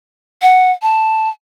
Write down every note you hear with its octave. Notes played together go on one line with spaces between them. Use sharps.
F#5
A5